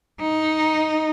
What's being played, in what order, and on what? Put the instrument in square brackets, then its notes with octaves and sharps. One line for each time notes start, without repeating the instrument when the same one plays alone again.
[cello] D#4